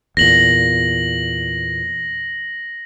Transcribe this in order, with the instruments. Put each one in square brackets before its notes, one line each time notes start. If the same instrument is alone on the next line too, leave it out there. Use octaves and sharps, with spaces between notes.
[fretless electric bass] E2 A#2 [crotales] A#6 F#7